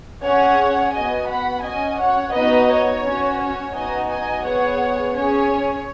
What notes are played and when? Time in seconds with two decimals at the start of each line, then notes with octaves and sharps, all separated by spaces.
0.22 C#4 G#4 C#5 F#5
0.93 B3 F#4 D#5 G#5
1.28 F#5 B5
1.63 C#4 F#4 D#5 G#5
1.98 C#5 F#5
2.33 B3 D#4 F#4 B4 D#5
2.69 C#5
3.03 C#4 F#4
3.38 C#5
3.74 B3 D#4 F#4 D#5 G#5
4.09 D#5 G#5
4.44 B3 G#4 C#5 F#5
5.14 C#4 G#4 C#5